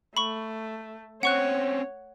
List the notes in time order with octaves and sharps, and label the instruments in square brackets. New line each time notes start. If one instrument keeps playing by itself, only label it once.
[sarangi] A3 [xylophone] B5 C#6
[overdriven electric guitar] C4 C#4 [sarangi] C#5 [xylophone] F#5 C#6 F#6